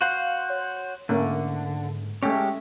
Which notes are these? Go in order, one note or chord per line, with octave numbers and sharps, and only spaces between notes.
F#4 C5 F5
C#5
G#2 D3 A3 A#3 C#4
G#3 A3 C#4 G4 C#5